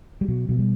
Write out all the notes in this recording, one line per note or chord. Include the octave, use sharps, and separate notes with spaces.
G3
B2 F#3
B2 F#3
G3